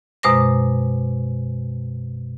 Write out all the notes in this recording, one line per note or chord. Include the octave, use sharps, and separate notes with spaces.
F#2 B2 G#3 C5 D6 A#6